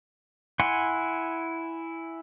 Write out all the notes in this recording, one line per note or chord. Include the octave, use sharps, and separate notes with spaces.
E4 F#5 G#5 C6